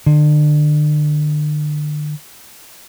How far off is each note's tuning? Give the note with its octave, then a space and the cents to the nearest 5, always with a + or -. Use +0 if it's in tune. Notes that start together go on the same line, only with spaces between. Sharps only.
D3 +35